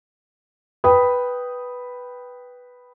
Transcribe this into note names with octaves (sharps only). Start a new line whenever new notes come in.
B4 G5 B5 D#6